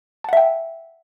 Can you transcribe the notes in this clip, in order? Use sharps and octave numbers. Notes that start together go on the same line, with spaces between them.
E5 F#5 G5 A5